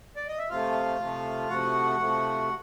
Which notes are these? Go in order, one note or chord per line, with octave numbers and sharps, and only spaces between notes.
D5
D#5
E5
C3 F3 A3 F4 F5
C3 F3 A3
C3 F3 A3 F#4 F#5
C3 F3 A3